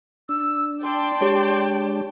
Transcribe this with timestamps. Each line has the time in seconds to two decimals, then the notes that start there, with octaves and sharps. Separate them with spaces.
0.29 D4 E6
0.83 D5 G5 A5 C6
1.21 G#3 D4 G4 C#5